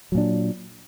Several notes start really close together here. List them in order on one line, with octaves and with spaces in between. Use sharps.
F#3 A#2 D4